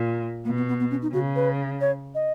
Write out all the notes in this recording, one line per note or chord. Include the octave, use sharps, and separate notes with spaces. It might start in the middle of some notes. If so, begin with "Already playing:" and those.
Already playing: A#2
B2 A#3
B3
B3
B3
C#4
D#4
C#3 F#4
B4
C#5
D#5